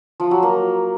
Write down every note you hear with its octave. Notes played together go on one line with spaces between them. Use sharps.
F3
F#3
A#3